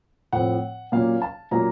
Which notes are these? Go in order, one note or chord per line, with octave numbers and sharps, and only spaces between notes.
A2 F3 C4 F#5
A#2 F#3 A#3 C#4 F5
A5
A#2 F#3 A#3 C#4 A#5